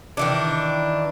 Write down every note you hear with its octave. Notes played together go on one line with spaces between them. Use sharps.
D#3 E3 D4